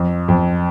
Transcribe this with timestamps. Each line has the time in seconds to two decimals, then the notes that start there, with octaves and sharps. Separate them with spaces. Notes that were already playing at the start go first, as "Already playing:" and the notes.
Already playing: F2
0.28 F2